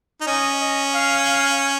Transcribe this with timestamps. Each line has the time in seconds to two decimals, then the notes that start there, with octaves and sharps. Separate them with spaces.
0.21 D#4
0.27 C#4 D#5
0.61 D#5
0.94 F5
1.26 F5